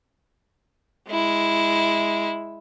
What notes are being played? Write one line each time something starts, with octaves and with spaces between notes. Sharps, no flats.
G#3 E4